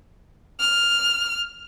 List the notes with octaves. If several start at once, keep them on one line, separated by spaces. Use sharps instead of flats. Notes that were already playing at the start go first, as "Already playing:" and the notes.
F6